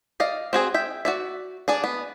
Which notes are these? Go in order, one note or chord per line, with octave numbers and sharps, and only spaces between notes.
D5 D#5 F5
C4 F#4 G#4
E5 G5
F#4 D5 E5
D4 G#4 D5
B3